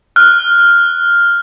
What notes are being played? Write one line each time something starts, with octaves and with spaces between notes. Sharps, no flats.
F6 F#6